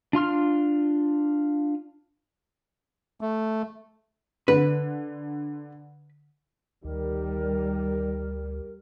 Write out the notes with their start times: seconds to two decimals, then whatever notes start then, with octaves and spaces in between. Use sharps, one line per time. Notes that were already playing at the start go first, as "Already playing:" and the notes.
0.13 D4 F4 C6 F6
3.21 A3
4.48 D3 B4
6.85 D2 D#3 G3 A#4